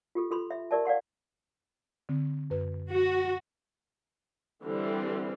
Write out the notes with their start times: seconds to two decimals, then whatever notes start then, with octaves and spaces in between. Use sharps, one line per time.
0.15 F4 G4 A4
0.31 F4 A4 B5 C6
0.51 E5
0.71 G4 A#4 D5 E5 A5
0.85 D5 F5 F#5 C6
2.09 D3 C4
2.50 F#2 B4
2.91 F#4
4.64 D3 E3 G3 C4